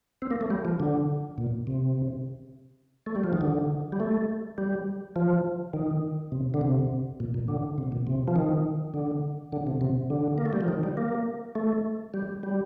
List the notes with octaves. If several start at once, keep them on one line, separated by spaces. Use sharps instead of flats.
C4
A#3
A3
G3
F3
D3
A#2
C3
A3
G3
F3
D#3
D3
G3
A3
G3
F3
D#3
C3
D3
C3
A#2
A#2
D3
C3
A#2
C3
F3
D#3
D3
D3
C3
C3
D3
A#3
A3
G3
F3
D#3
G3
A#3
A3
G3
G3